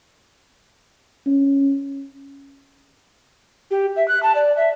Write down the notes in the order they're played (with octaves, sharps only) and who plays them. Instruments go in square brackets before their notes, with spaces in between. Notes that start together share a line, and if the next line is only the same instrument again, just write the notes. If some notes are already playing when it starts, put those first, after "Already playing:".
[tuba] C#4
[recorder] G4
E5
F#6
A5
D5
E5